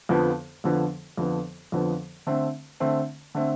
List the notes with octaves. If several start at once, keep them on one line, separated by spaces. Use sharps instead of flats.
F2 D3 F3 B3
F2 D3 F3 B3
F2 D3 F3 B3
F2 D3 F3 B3
D3 A3 C4
D3 A3 C4
D3 A3 C4